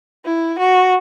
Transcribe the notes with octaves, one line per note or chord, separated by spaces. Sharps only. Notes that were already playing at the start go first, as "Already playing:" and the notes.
E4
F#4